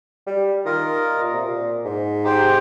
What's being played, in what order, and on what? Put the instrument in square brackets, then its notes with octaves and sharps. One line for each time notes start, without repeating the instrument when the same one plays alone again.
[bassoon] G3
[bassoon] D#3 [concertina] F4 A#4 D#5
[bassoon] A#2
C3
A#2
G#2
[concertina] D#4 G4 C5 G5